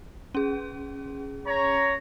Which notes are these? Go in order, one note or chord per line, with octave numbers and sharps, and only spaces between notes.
C#4 G#4
C#5 A#5